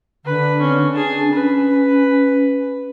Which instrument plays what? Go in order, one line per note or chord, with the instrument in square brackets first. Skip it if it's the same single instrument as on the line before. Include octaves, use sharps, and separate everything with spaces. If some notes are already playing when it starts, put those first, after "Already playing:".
[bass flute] D3 [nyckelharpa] B4
[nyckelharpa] C4 C#4
[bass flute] D4 [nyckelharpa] G#4 A5
[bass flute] C#4 [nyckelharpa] B4